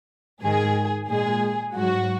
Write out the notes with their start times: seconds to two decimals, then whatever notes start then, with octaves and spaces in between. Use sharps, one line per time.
0.42 G#2 D#3 G#3 G#4
1.09 A#2 G#3 G#4
1.75 G#2 F#3 F#4